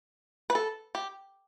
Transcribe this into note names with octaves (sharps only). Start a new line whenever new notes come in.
B4
A4
G4